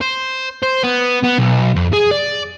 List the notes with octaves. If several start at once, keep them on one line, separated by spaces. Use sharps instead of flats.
C5
C5
B3
B3
B1
F2
G#4
D5